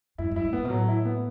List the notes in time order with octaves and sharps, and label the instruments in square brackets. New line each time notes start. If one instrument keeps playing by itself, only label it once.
[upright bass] F#2 [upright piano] E4
[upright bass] F#2
[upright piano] E4
[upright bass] G#2
[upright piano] B3
[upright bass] A2
B2
[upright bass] A2 [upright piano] F#3
[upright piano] E4
B3